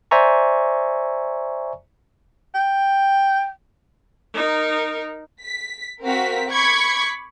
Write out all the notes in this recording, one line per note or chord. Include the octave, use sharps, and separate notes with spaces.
C5 D5 E5 G#5 A#5 C#6
G5
D#4 A#4
B6
C4 F#4 A#4 F5 B6
B5 C#6 D6 G#6 B6 C#7